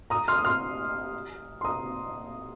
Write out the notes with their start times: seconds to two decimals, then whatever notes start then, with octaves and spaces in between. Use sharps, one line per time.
0.10 A#5 D#6
0.28 C6 F6
0.38 D#6
0.45 C6 F6
1.61 C6
1.65 A#5 D#6